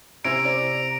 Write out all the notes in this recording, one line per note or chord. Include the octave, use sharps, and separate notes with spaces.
C3 C#4 E4 G#5 A#5 D7
D5